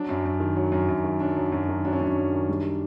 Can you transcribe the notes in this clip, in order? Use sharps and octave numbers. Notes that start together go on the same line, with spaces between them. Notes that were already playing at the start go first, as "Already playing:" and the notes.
Already playing: F#3 D4
F#2
F#2
D#3
F#3
F#2
F#2
D#3
F#3 D4
F#2
F#2
D#3
F#3 D4
C#4
F#2 D4
F#2
D#3
G3